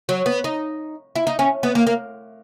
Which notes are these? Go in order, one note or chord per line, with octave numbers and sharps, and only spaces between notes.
F#3
B3
D#4
E4
D#4
C#4
B3
A#3
A#3